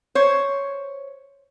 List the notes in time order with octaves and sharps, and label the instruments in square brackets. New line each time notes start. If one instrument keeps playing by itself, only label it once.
[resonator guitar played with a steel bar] C5 C#5